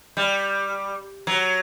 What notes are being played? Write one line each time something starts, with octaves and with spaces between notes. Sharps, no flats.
G3
F#3